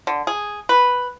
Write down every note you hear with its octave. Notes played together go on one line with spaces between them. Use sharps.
D3
G#4
B4